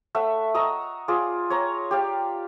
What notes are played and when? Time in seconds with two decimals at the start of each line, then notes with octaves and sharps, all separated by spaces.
0.15 A3 E5 F#5
0.54 D#5 A#5 C#6 E6
1.08 F4 G#4 D5
1.50 C#5 A#5
1.91 G4 D5 F5